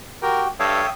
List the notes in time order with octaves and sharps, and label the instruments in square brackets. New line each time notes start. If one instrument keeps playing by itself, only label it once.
[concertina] F#4 G4 G5 [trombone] A#4
[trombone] G2 [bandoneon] A4 C#5 F5 [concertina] E5 G5 D#6